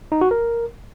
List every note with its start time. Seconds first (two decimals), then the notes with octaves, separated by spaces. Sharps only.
0.12 D#4
0.21 F#4
0.31 A#4